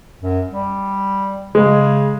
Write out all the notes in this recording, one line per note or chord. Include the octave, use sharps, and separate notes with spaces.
F#2
G3
C#3 G#3